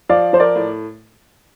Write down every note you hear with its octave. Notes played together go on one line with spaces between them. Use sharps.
F3 D5 F5
F3 C5
A#4 D5
A2